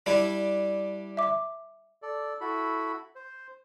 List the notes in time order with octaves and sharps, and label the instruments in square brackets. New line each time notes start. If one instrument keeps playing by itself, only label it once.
[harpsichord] G3 D4 E4
[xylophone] E5 D6
[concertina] A4 D5
E4 F#4 A4 B5
C5